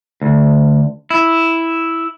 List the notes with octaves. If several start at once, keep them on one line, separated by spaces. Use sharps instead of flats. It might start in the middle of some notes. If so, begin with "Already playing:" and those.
D2
E4